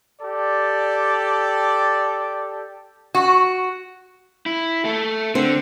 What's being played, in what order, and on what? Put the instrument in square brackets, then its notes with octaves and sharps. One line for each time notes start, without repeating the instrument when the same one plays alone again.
[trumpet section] G4 A4 D5
[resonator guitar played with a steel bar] F#4
[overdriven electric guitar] E4
A3 A4
[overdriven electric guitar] D3 [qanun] C4